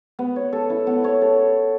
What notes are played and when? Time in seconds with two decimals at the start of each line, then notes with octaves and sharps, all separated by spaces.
0.19 B3
0.36 C#5
0.53 A4
0.70 E4
0.87 B3
1.04 C#5
1.22 A4